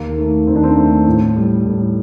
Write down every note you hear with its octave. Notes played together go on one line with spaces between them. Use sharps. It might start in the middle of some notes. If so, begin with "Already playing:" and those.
Already playing: D#2 A#3
D#3 A3
D#2 C4
D4
C4
D#3 A3
A2
G3
A2